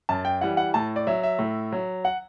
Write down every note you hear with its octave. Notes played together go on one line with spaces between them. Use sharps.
F#2 A5
G5
E3 G3 F#5
F#5
A2 A5
D5
F#3 E5
E5
A2
F#3
F#5